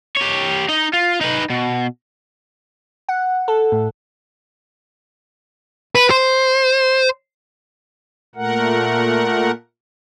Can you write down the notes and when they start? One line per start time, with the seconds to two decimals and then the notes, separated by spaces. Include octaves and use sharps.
0.17 G4 C#5
0.69 D#4 D#5
0.93 F4
1.21 D#4 B4
1.50 B2
3.09 F#5
3.48 A4
3.72 A2
5.95 B4
6.10 C5
8.36 A#2 A3 A#4 F#5